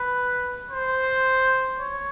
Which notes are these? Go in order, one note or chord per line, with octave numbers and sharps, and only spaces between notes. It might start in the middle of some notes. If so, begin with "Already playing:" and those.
Already playing: B4
C5
C#5